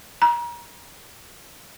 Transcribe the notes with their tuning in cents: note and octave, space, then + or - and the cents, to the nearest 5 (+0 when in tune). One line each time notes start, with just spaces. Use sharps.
A#5 +35